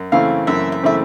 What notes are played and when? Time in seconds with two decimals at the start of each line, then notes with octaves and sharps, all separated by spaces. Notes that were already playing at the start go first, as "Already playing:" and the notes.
Already playing: F#2
0.12 C#3 E3 A3 C4 F5
0.47 F#2 E5
0.72 E5
0.83 C#3 E3 A3 C4 E5